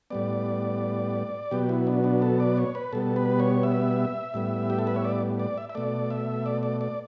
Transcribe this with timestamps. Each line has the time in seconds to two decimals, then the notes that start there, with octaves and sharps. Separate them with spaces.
0.10 A2 G3 B3 D5
1.51 B2 F#3 B3 G4
1.69 E4
1.87 D4
2.04 D4
2.22 A4
2.40 D5
2.57 C#5
2.75 B4
2.93 B2 G3 B3 A4
3.16 B4
3.40 C#5
3.63 E5
4.34 A2 G3 B3
4.70 G4
4.79 A4
4.87 B4
4.96 C#5
5.04 D5
5.39 D5
5.57 E5
5.69 E5
5.75 B2 A3 D5
6.10 E5
6.46 D5
6.63 D5
6.81 D5